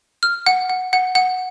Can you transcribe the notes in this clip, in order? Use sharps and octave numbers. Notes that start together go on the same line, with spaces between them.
F6
F#5
F#5
F#5
F#5